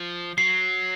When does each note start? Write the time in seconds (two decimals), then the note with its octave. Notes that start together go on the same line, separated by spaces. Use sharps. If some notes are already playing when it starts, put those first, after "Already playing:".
Already playing: F3
0.38 F#3 C7